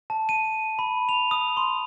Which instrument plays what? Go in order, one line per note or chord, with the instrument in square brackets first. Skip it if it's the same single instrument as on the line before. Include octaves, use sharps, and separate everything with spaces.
[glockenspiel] A5
D#7
B5
F7
D#6
C6